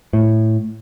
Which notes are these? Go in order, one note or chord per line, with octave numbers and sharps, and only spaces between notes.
A2